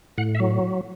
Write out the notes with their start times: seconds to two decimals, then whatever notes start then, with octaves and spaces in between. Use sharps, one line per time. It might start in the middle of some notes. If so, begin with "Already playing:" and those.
0.18 A2 F#5
0.35 E5
0.40 F#3